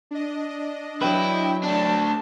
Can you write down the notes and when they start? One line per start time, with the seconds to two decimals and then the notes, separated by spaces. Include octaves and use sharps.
0.11 D4 D#5
1.02 F#3 E4 B4 G5
1.64 A3 D4 A5